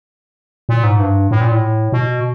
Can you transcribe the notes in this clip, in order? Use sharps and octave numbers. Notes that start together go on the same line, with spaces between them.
A#2
G#2
G2
A2
A#2
A2
B2